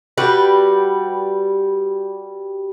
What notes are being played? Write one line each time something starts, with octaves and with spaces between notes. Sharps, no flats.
G3 F#4 G4 B4